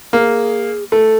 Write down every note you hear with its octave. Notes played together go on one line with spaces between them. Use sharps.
A#3 G#4
A3 A4